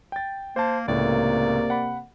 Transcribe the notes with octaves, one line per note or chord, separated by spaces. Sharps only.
G5 A6
A#3 C5 A5
C#2 A2 C3 A#3 D5
F#5 B5